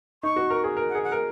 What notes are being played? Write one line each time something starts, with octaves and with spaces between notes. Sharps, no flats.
D#4 C#6
F#4
A#4
G#4
A#4
F#5
G#4
F#5
A#4